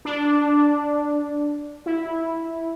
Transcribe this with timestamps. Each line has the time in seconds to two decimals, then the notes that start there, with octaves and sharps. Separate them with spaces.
0.05 D4
1.86 E4